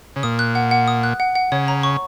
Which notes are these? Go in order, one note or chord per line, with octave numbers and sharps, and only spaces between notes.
C#3
A#2 D#6
F#6
F#5
F#5
D#6
F#6
F#5
F#5
C#3 C#5
A#5
C#6